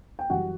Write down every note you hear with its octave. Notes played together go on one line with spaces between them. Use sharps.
G5
F#2 E3 G3 F#4 F#5